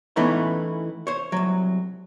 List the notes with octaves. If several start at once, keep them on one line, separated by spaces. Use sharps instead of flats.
E3 A3 B3 C#4 D#4 E4
C5 C#5
C2 F#3